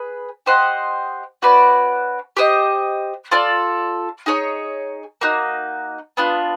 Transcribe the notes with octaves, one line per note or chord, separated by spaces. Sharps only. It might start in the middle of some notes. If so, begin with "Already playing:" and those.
Already playing: G#4 B4
G4 C5 D#5 F#5
C#4 F#4 B4 D5
G4 C5 D#5
F4 A4 D5
D#4 G#4 C#5
A#3 D#4 F#4
B3 D4 F4